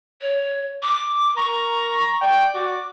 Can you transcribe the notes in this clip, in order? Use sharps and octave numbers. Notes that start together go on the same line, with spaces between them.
C#5
D6
A#4 A#5 C#6
D5 G5
F#4 D6